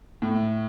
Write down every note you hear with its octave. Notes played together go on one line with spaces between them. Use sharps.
A2